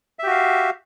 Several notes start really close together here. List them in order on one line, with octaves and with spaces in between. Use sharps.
E5 G4 F#4 F5